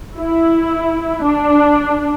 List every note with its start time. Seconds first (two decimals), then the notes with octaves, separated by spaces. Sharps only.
0.17 E4
1.23 D4